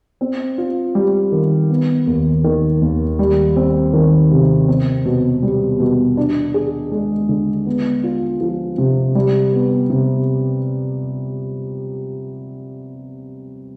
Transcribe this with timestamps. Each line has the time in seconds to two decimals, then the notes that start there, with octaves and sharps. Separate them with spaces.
0.21 C4
0.58 F4
0.95 G3
1.32 D#3
1.70 B3
2.07 D#2
2.44 D#3
2.82 D#2
3.19 G3
3.56 C4
3.93 D#3
4.31 C3
4.68 C4
5.05 B2
5.43 G3
5.80 B2
6.17 D4
6.54 G#4
6.92 G#3
7.29 D3
7.66 B3
8.04 F4
8.41 F3
8.78 C3
9.15 G3
9.53 B3
9.90 C3